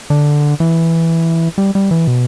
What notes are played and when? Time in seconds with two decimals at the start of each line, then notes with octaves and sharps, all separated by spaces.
0.10 D3
0.60 E3
1.58 G3
1.75 G3
1.91 E3
2.07 B2